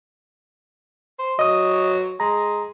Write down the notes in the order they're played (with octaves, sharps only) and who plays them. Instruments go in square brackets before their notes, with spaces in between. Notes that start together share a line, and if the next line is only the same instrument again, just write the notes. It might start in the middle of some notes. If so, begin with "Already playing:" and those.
[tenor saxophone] C5
[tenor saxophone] F#3 [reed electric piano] D#5 D#6
[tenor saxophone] G#3 [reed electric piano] A#5